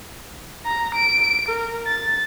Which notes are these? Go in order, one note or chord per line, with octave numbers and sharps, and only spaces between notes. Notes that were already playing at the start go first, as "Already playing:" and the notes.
A#5
D7
A#4
A6